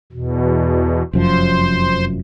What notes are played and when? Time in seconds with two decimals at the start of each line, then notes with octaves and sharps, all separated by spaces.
0.12 E2 B2
1.13 F1 F#2 F3 C5